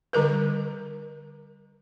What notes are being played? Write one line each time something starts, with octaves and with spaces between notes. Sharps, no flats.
D3 G3 A#4 B4